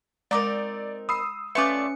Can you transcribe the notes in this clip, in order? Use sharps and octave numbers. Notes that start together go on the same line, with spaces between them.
G#3 C4 D#4 A#4 D5 A#5 D6
B5 D#6 E6 C7
A3 C#4 F4 B4 D5 E5 C6 C#7